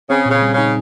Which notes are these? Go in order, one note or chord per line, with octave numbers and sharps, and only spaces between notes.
C#3 C4
A#2 C#3
G3
C#3 D#4